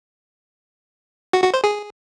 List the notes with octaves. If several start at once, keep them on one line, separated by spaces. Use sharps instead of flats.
F#4
F#4
C5
G#4